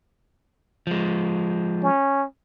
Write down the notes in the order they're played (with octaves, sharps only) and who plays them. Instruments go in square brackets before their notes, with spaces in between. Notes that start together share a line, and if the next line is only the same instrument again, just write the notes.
[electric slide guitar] F3 G#3
[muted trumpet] C#4